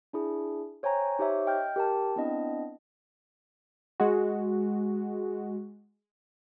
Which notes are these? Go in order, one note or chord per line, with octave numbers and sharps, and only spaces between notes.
D4 E4 G#4
C5 C#5 G5 G#5 A#5
D#4 G4 C5 C#5 E5
D#5 G5 F6 G6
G4 A#4 G5 A5
B3 C4 D4 E4 D#5 G5
G#3 F#4